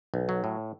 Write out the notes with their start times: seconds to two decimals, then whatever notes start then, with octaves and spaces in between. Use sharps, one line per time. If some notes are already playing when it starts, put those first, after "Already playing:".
0.14 B1
0.29 F#3
0.44 A2